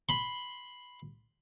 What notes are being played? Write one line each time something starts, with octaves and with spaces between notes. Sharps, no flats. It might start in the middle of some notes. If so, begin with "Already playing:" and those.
B5 C6